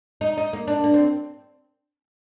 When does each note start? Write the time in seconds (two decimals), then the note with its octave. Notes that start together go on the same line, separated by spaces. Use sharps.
0.21 D#4
0.37 D#4
0.53 A#3
0.67 D4
0.84 A#3
0.94 C4